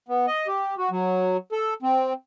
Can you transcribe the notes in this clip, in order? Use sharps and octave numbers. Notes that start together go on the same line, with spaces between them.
B3
D#5
G4
F#4
F#3
A4
C4